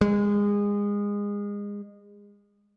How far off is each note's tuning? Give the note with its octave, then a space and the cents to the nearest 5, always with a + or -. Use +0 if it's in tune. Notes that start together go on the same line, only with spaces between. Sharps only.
G#3 -25